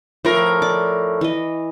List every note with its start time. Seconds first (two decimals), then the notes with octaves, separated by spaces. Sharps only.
0.25 A2 F3 A#4
0.62 D5 D6
1.21 E3 D#5